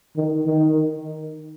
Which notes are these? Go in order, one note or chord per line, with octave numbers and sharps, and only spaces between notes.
D#3
D#3